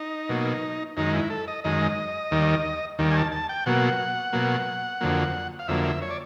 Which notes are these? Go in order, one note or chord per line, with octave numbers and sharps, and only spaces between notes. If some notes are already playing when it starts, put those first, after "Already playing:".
Already playing: D#4
B2 F#3 A#3
F#2 D#3 G#3 D#4
E4
A4
D#5
F#2 D#3 G#3 D#5
D#2 D#3 G3
D#2 D#3 G3
G#5
A5
A5
G5
B2 F#3 A#3 F#5
B2 F#3 A#3
F2 D3 F#3 A#3
F5
F2 D3 F#3 A#3 E5
E5
C#5
D5